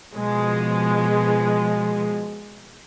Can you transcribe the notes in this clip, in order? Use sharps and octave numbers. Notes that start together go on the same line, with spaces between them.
B2 F3 G#3